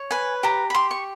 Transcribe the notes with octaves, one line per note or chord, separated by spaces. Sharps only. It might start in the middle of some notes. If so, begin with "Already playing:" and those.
Already playing: C#5
B4 G#5
G4 A#5
B5
G4 C6
C#6